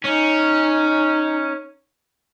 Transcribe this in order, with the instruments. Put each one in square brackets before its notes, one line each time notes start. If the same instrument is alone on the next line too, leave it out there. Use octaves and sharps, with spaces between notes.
[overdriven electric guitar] C#4 [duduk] D#4